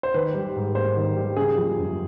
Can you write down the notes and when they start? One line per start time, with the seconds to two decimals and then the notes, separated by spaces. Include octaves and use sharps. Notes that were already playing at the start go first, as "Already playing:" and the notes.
0.03 C5
0.14 D#3 B4
0.34 G3
0.56 G#2
0.75 A#3 C5
0.96 D#3
1.16 G3
1.37 C#3 G#4
1.57 F3
1.78 F#2